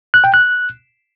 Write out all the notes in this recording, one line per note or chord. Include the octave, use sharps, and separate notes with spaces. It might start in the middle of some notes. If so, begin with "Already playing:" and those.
F#6
G5
F#6